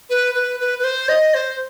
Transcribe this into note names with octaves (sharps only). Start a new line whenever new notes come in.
B4
B4
B4
B4
C5
D#5
C5